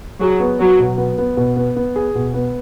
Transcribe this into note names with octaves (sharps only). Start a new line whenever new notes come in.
F#3 G#4
B3
F#3 B3
B2
B3
B3
B2
B3
B3
G#4
B2
B3